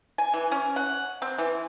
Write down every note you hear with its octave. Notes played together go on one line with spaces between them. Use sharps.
G#5
E3
C#4
F#5
C4
E3